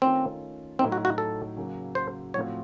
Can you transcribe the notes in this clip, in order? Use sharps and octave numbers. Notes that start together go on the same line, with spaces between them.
D#3 A3 C4 C#4 F4
A2 F#3 A3 C4 D#4
F#4
F#4
A4
C#3 F#3 A#3
C5
A2 F3 A3 C4 F#4 C#5